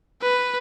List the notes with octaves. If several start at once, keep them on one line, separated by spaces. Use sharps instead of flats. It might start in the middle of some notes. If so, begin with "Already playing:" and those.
B4